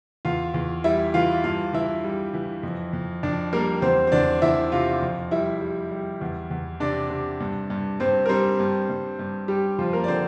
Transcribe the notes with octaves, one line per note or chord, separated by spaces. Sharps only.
E2 F4 F5
E2
G3 E4 E5
E3 F4 F5
G2 F4 F5
E3 E4 E5
G3
E3
F2
F2
F2 D4 D5
G3 A#3 A#4
E2 C4 C5
C5
E2 D4 D5
E2 E4 E5
C3 F4 F5
F2
G3 E4 E5
G3
G3
E2
E2
C3 D4 D5
C3
G2
G2
G2 C4 C5
A#4
G3 C4 C5
G2
G2
G2
G3 G4
F2 F3 F4
A#3 A#4
D5
D3 C4 C5